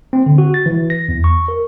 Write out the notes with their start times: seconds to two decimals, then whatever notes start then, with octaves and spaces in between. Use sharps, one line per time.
0.13 C4
0.26 D3
0.38 F#4
0.54 A6
0.66 E3
0.90 A#6
1.09 E2
1.24 C#6
1.48 A#4